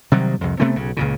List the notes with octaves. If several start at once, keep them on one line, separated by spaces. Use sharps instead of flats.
C3 D#3 F#3 G3
C2 F2
C3 A3 B3 C4
B1 C#3
C#2 A#2 C#3